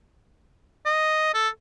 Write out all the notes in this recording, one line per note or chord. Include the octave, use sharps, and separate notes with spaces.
D#5
A4